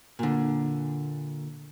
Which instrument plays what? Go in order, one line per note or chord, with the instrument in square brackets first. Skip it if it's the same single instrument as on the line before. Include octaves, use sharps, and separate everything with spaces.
[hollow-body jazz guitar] A#2 D3